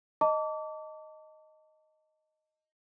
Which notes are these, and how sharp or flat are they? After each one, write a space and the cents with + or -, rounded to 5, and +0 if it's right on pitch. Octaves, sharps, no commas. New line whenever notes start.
D#5 +0 A5 +30 D6 -30